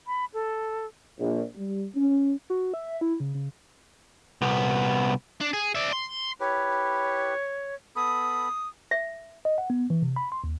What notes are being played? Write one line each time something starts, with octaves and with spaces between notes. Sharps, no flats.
B5
A4
A#1
G3
C#4
F#4
E5
E4
C#3
C#3
C2 B3
D4
G#4
D5 E5
C6
E4 G4 B4 C#5
B3 A4 B5 D#6
E5
D#5
F#5
B3
E3
C3
B5
C6
D#2